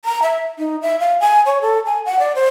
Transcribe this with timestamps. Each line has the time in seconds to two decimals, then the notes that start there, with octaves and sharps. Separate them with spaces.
0.05 A#5
0.23 E5
0.59 D#4
0.82 E5
1.00 F5
1.20 G#5
1.46 C#5
1.62 A4
1.86 G#5
2.06 F#5
2.19 D5
2.35 C5